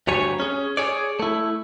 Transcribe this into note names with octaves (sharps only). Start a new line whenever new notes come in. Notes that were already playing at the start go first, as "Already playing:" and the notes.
D2 G2 F#3 G3 C#5 G#5
C#4 G#4
G#4 C#5 D5
A3 E4